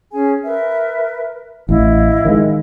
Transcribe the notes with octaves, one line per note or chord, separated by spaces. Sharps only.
C#4 G#4 G#5
A#4 B4 E5
A1 E4 D#5 F5
D#3 F3 G#3